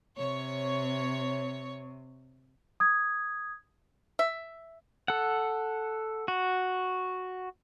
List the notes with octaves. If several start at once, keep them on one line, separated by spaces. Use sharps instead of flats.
C3 C#5
D#6 G#6
E5
A4 F#5
F#4